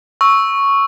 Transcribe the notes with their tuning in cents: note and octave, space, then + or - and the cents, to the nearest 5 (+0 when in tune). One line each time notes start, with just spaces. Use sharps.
C#6 +0 E6 -5